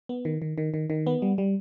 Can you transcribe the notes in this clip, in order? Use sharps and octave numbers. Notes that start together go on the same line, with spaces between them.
B3
D#3
D#3
D#3
D#3
D#3
B3
G3
G3